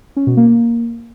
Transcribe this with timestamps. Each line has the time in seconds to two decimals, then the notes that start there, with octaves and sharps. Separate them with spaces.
0.17 C#4
0.27 B2
0.37 A#3
0.47 A#3